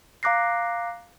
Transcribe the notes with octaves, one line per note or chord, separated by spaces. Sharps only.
F5 A#5 D6 F#6 A#6 C7